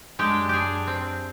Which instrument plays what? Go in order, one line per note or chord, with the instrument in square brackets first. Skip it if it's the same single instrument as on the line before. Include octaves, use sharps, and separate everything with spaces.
[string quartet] F#2 D4 [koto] G#3 G4
[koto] G4 G#4
C4